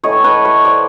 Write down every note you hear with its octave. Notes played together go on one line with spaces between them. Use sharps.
A2 E3 A3 C#5 D#5
B4 C#5
B4 C#5
C5 D5